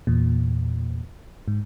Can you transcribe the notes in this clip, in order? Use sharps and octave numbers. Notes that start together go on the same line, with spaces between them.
E2 A#2
G#2